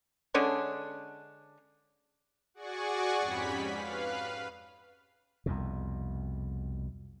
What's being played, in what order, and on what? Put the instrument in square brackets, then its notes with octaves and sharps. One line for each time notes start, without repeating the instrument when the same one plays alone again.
[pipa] D3 G#3 C#4 D4
[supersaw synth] F#4 G#4 D5 F#5 G#5 C#6
F2 G#2 C#4 G4 B5 B6
B4 F5
[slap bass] C2 F2 B2